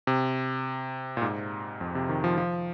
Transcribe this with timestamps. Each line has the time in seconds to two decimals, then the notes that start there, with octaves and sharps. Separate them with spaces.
0.07 C3
1.17 A#2
1.22 G#2
1.81 F2
1.95 C3
2.09 D#3
2.24 F3
2.38 F3